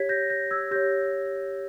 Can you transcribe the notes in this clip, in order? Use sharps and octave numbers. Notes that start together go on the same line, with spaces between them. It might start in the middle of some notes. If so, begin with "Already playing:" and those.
Already playing: G4 C#5 G#6 B6
G6 A#6
G6 A#6
E6 G#6
G4 C#5 G6 A#6